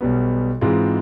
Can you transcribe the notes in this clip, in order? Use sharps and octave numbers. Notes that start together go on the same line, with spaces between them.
B1 B2 G3 B3
G#2 E3 G#3 C4 F4